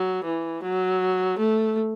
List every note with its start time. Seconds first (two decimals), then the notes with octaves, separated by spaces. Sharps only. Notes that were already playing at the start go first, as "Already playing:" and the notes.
Already playing: F#3
0.24 E3
0.62 F#3
1.38 A3